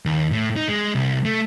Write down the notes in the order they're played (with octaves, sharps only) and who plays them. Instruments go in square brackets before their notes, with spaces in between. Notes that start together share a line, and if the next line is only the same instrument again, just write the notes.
[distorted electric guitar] D#2
A2
D#4
G#3
C2
A3